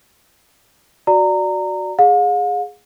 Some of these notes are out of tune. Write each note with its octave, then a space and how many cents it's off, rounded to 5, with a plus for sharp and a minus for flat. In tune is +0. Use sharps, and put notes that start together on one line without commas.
F#4 +0 D5 +0 A#5 -20
G#4 +0 F5 +45